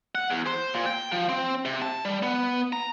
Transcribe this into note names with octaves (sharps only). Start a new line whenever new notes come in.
F#5
E2
C5
A#2
G5
F3
C4
C3
A5
G3
B3
A#5